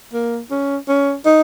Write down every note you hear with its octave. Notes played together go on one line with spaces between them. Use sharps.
A#3
C#4
C#4
D#4